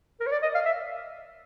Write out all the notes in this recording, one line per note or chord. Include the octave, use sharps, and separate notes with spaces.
A#4
C#5
D5
D#5
F5
E5